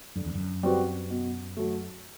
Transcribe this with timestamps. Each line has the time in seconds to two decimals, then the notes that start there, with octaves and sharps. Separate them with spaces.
0.16 F#2 D3
0.25 E2
0.34 F#2
0.63 G3 C4 F#4 B4
1.10 B2
1.57 F#3 A3